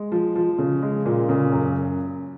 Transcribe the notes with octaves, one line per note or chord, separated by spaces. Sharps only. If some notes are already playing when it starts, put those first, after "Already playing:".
Already playing: G#3
F3
F3
C#3
G#3
A#2
C#3
F#2